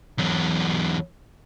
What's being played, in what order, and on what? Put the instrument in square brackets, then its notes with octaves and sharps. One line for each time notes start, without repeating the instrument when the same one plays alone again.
[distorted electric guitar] E2 F#3